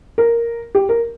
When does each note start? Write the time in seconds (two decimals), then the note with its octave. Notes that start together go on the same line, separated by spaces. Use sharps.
0.18 A#4
0.75 G4
0.89 A#4